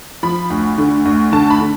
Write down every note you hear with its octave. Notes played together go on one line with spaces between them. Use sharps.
F3 B5
D2
D3
D2
D3 A5
B5
D3